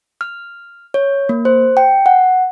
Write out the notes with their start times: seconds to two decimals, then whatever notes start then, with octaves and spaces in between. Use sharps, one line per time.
0.21 F6
0.94 C#5
1.29 A#3
1.45 C5
1.77 G5
2.06 F#5